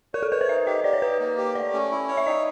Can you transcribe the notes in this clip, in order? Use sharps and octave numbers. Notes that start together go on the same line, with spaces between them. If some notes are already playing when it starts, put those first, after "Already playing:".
A#4 C#5
A4
B4 C#5
C5
D#4 E5
G4 D#5
G4 D5
C#5
D#4 B4
A#3
G4
A3 D5
C#4
E4
C#5
E5
D#4 D#5